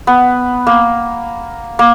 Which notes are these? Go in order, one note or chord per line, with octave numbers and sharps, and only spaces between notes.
B3
A#3
A#3